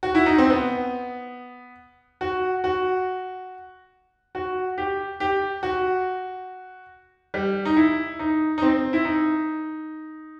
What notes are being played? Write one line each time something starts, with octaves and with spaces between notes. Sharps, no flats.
F#4
E4
D#4
C4
B3
F#4
F#4
F#4
G4
G4
F#4
G3
D#4
E4
D#4
D#4
C4
E4
D#4